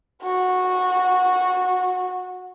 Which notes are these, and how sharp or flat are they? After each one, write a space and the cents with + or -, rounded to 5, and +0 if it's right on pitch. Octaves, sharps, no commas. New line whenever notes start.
F#4 -15